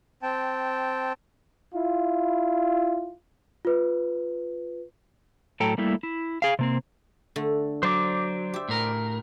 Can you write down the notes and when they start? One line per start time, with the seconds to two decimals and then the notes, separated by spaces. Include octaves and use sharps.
0.23 C4 G5 A5
1.74 E4 F4
3.65 F4 B4
5.60 A2 F#3 A4 G5 A#5
5.78 G3 A3 A#3 E4
6.03 E4
6.42 G#4 F5
6.59 C3 A#3 C4
7.36 D3 A3
7.83 F#3 C5 D5 D6
8.53 G4 E5
8.69 A2 A#4